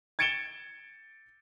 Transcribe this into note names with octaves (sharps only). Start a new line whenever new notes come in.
G#6 A6 C#7 D7 E7 G7